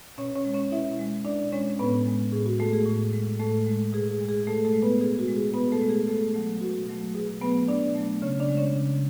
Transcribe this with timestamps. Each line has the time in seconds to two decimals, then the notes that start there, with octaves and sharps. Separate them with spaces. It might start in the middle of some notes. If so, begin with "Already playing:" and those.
0.18 B2 C#4 C#5
0.35 C#4 C#5
0.45 G#3
0.54 C#4 C#5
0.71 B2 E4 E5
0.99 G#3
1.25 B2 D4 D5
1.52 G#3 C#4 C#5
1.79 A2 B3 B4
2.06 G#3
2.32 A2 G#4
2.46 F#4
2.59 G#3 A3 A4
2.73 G#4
2.86 A2
3.13 G#3
3.40 A2 A3 A4
3.66 G#3
3.93 B2 G#4
4.11 G#4
4.20 G#3
4.29 G#4
4.47 B2 A3 A4
4.65 A3 A4
4.74 G#3
4.82 B3 B4
5.01 B2 G#4
5.19 F#4
5.28 G#3
5.36 G#4
5.54 B2 B3 B4
5.72 A3 A4
5.81 G#3
5.89 G#4
6.07 B2 A3 A4
6.34 F#3 A3
6.61 B2 F#4
6.89 F#3 A3
7.14 B2 G#4
7.41 F#3 A3 B3 B4
7.68 B2 D4 D5
7.95 F#3 A3
8.22 C#3 C#4 C#5
8.40 D4 D5
8.49 G#3
8.57 C#4 C#5
8.76 C#3